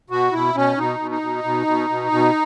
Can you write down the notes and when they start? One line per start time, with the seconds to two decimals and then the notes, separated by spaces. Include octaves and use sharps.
0.10 B2 F#4
0.33 B2 E4
0.55 B2 C#4
0.78 B2 D#4
0.99 B2
1.11 D#4
1.22 B2
1.44 B2
1.67 B2
1.90 B2
2.12 B2